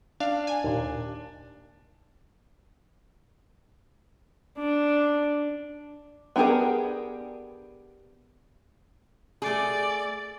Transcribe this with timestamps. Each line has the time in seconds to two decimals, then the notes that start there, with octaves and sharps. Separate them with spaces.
0.20 D4 F5
0.47 G#5
0.64 D#2 A#2
4.59 D4
6.36 B3 D4 G4 G#4 A#4
9.42 A3 G#4 D5